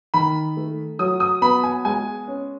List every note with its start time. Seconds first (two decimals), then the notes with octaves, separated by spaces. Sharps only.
0.14 D#3 B5
0.57 A3
0.99 F#3 D#6
1.20 D#6
1.42 B3 B5
1.64 G#5
1.85 G#3 G#5
2.28 C#4